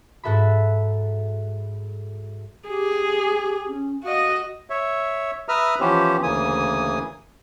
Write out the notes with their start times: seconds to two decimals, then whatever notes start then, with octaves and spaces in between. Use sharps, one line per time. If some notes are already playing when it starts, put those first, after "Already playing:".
0.24 G#2 F#4 A4 E5 B5
2.69 G4 G#4
3.68 C#4
4.03 F#4 D#5 F5
4.70 C#5 E5
5.49 B4 E5 A#5 D#6 F6
5.80 E3 F3 B3 C#4 G4 C5
6.23 D2 C#3 E3 A#3 G#5 D#6